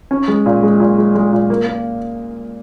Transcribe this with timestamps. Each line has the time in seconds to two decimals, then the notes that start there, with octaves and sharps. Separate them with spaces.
0.11 C#4
0.28 G#3
0.46 A#2
0.63 G#3
0.80 A#2
0.98 G#3
1.15 G#3
1.32 A#2
1.50 A#3
1.67 A#3